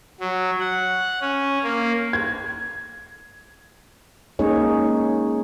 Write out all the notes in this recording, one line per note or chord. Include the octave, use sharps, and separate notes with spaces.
F#3
F#5
C#4
A#3
G#6
G#3 A#3 C#4 D#4 G#4 C#5